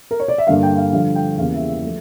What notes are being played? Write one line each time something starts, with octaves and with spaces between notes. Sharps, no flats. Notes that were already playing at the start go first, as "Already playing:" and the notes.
A#4
C#5
D5
E5
G2 D3 G3 A#3 F5
G5
F5
G2 D3 F3 F5
G5
E2 C#3 E3 G3 A#3 F5
E5
E5
F3 A3